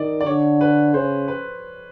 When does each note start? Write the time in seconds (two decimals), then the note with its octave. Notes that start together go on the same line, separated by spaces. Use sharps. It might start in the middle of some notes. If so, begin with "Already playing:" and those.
Already playing: D#3 D5 D#5
0.21 D5
0.26 D3 C#5
0.61 B4
0.94 C#3 C5
1.28 B4